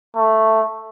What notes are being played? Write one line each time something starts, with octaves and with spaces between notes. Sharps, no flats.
A3